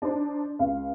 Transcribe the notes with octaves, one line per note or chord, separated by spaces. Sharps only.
D4 D#4 C5
C#2 F5